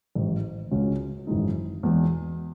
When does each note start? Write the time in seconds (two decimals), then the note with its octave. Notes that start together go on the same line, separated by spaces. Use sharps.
0.15 A1 G#2 D#3
0.71 C#2 C#3 G#3 C#4 F#4
1.27 G#1 F#2 E3 G#3 D#4
1.83 E2 B2 G#3